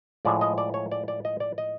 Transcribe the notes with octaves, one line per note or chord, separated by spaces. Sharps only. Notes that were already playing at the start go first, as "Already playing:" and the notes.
A2 F3 G#3 D5
D#5
D5
C#5
D5
D5
D#5
D5
D#5